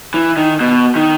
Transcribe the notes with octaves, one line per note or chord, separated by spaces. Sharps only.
E3
D#3
B2
D#3